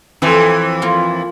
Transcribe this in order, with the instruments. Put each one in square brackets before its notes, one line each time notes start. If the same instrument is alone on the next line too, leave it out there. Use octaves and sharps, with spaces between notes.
[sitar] F2 E3 [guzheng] A4 C5 G#5
[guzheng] F3 A#3 F4